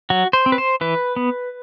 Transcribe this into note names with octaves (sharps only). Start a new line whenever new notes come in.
F#3 F#4
C5
C4
B4
C5
E3 B4
B3